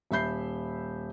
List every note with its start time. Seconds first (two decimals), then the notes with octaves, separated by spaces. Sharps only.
0.11 D#1 E5 B5 G6 C7